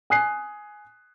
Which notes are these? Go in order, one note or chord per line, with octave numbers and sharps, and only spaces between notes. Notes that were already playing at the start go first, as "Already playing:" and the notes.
G#5 D#6 F#6 C7